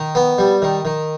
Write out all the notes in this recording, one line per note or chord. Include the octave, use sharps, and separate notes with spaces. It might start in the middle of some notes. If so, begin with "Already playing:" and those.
Already playing: D#3
B3
G3
D#3
D#3